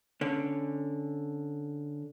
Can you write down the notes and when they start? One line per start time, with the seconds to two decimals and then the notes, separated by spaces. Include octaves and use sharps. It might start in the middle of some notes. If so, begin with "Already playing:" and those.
0.21 D3 C#4